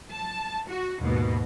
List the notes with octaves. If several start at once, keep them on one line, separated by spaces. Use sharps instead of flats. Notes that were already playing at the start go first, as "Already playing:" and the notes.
A5
F#4
D#2 G#2 B2